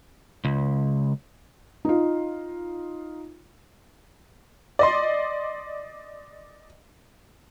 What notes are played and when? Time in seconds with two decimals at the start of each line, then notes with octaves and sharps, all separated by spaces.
0.45 C#2
1.85 D#4 F4
4.79 D5 D#5 C6